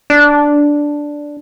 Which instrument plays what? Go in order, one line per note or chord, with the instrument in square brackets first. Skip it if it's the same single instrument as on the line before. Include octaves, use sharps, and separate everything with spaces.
[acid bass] D4